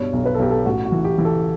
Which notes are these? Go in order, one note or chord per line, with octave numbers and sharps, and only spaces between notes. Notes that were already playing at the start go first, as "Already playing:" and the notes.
Already playing: G2 B2 C#5
B1
B4
A4
B1 G4
A4
A1 F#4
F#4
E3
G4
E3
A4